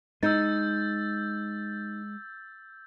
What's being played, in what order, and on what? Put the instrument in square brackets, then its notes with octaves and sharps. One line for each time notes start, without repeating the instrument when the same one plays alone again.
[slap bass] G#3 [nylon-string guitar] D#4 [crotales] E6 G6 A6